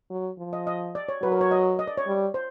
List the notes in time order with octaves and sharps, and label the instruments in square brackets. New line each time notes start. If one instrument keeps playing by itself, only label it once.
[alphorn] F#3
F3
[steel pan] D#5
D#5
D5
C#5
[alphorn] F#3 [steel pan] B4
[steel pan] A#4
C#5
D#5
D#5
D5
C#5
[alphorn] G3
[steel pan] C5